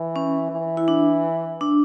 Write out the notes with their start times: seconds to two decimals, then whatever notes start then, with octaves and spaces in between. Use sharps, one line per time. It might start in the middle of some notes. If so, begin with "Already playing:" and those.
Already playing: E3
0.16 C#4
0.52 E3
0.77 E4
0.88 D4
1.61 D4